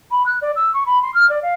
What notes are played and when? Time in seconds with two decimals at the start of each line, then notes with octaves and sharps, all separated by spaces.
0.11 B5
0.26 F#6
0.41 D5
0.55 E6
0.74 C#6
0.86 B5
1.02 C6
1.14 F6
1.29 D5
1.42 F5